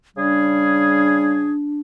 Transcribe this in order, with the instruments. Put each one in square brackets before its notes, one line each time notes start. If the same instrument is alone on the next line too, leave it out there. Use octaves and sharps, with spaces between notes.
[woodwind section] C#3 G3 G#4 [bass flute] D4